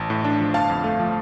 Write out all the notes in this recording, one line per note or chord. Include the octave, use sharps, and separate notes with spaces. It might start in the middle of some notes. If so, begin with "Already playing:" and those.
Already playing: A1 A5
A2
D4
F3
G1 F5 A5
F2
A3
F3